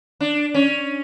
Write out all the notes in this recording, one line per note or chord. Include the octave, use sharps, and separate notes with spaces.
D4
C#4